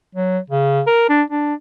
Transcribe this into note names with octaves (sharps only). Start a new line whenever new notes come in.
F#3
C#3
A#4
D4
D4